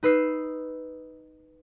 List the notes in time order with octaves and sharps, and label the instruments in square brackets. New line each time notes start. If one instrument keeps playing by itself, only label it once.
[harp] D#4 B4 E6 C7